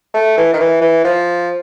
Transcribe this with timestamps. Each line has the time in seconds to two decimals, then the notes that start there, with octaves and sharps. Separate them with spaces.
0.14 A3
0.37 E3
0.53 D#3
0.60 E3
0.81 E3
1.04 F3